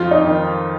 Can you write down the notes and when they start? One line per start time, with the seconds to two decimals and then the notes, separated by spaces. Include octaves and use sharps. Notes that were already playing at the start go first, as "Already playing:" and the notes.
Already playing: F2 F4
0.11 D#4
0.25 D#3